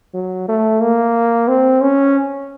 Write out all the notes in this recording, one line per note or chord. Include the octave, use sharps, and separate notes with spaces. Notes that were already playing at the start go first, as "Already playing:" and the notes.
F#3
A3
A#3
C4
C#4